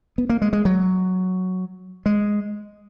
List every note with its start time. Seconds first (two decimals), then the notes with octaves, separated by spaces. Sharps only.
0.18 B3
0.30 A#3
0.42 G#3
0.53 G#3
0.65 F#3
2.06 G#3